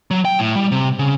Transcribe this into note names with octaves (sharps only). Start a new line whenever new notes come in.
F#3
G5
A2
G3
C3
C#3